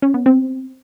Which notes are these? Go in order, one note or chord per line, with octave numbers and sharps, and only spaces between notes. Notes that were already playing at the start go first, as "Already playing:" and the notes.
C#4
B3
C4